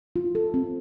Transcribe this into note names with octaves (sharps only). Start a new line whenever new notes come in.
F4
A4
C4